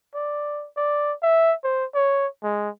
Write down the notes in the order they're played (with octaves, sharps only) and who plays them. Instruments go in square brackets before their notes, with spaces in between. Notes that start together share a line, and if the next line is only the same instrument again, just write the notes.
[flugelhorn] D5
D5
E5
C5
C#5
G#3